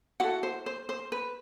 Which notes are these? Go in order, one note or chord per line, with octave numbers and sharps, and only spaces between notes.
E4 F#4 A4 F#5
C5
C5
C5
B4